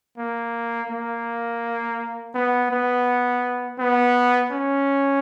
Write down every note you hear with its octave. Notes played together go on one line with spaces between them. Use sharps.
A#3
A#3
B3
B3
B3
C#4